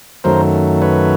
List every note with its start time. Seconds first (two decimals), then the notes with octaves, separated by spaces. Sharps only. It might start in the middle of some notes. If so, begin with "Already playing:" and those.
0.24 F#2 D#3 F#3 A3 A#4 C5
0.82 B4 C#5